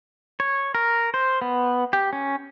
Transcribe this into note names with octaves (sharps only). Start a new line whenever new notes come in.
C#5
A#4
C5
B3
G4
C#4